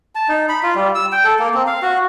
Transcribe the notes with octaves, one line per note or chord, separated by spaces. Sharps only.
A5
D#4
B5
F4
G3
E6
G5
A4
A#3
C4
F5
F#4